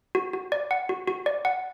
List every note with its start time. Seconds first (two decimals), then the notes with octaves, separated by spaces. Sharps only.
0.15 F#4
0.33 F#4
0.52 D5
0.71 F#5
0.89 F#4
1.08 F#4
1.26 D5
1.45 F#5